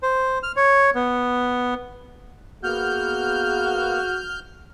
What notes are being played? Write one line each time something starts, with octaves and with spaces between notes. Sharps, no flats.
C5
F6
C#5
B3
A#3 B3 F#4 G#4 F6 G6